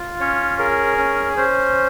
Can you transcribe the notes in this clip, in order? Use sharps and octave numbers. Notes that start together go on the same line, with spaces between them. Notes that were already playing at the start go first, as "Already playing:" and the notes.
Already playing: F4
C#4 C#5
G#4 A#4
C#4
C#4 C5